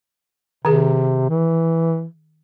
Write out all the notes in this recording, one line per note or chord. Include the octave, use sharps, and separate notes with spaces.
C3 D#3 G#4
E3